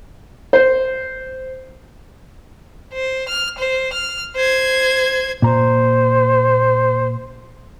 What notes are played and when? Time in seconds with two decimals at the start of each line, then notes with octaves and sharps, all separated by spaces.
0.53 C5
2.93 C5
3.29 F6
3.58 C5
3.93 F6
4.36 C5 G#6
5.42 A#2 C5 A#5